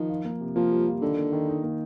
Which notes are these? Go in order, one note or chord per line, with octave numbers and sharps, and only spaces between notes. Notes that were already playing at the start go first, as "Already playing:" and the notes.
Already playing: D#3 F3
F4
A#3
C3
F3 A#3
G3
F4
D3 D#3
A#3
D#3
D#4
A#3